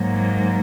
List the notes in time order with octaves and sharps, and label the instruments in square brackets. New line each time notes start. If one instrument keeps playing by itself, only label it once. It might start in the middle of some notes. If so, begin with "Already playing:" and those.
Already playing: [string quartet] G#2 F#3 A#3